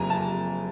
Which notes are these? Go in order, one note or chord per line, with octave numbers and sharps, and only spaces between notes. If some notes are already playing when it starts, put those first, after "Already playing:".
Already playing: F#1 F2 G#5 A#5
A5